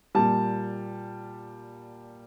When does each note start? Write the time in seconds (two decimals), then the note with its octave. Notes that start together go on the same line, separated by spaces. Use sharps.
0.15 A#2 G3 A5